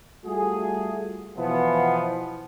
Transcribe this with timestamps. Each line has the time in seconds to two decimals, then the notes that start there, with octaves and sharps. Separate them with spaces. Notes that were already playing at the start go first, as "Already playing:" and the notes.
0.26 G3 A3 F4 F#4 G#4
1.38 B2 E3 F3 B3